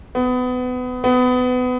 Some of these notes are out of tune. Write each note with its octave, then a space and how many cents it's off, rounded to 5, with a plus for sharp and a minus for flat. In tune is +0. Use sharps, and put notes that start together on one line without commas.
B3 +25
B3 +25